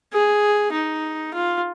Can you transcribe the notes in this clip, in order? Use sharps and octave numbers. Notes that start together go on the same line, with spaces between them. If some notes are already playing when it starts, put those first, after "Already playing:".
G#4
D#4
F4